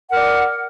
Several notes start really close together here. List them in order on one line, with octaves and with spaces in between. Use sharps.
F#5 A#4 D5